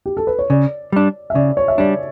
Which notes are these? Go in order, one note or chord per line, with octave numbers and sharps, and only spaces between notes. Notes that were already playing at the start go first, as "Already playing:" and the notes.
G4
A4
B4
C#5
C#3 D5
G3 D4
E5
C#3 D5
C#5
E5
G3 D4 D5